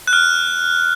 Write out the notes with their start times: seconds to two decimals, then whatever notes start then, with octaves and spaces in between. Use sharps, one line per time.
0.07 F#6
0.13 F6